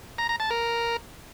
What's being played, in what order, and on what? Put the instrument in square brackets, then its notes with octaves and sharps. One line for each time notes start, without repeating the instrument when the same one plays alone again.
[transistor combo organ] A#5
A#5
A5
A#4